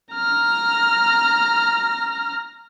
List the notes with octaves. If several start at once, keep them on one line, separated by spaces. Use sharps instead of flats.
A#5 F6